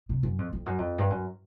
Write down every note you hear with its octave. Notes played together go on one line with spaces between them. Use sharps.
C3
F#2
F2
F2
F#2
F2
G2
F#2